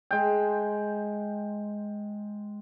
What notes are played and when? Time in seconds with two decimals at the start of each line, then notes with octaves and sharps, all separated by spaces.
0.11 G#3 G5